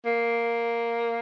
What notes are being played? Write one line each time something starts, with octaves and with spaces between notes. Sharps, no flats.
A#3